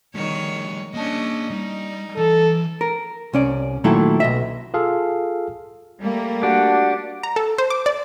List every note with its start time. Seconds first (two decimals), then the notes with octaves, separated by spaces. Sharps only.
0.15 D#3 G3 A3 C#5
0.94 A#3 C#4 D4 D#5 A5
1.50 G3 D#4
2.17 E3 A4
2.81 A#4
3.33 C2 C#4 D5
3.84 A#2 D#3 F#3 A3 E4 A4
4.20 B1 D#5 E5
4.74 F4 G#4 A4 F5
6.01 G3 A3 A#3
6.43 D4 F#4 G4 F#5
7.23 A#5
7.36 A4
7.58 C5
7.70 D6
7.86 D5